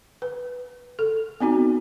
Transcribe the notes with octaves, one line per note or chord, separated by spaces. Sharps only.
B4
A4
B3 C4 D#4 F#4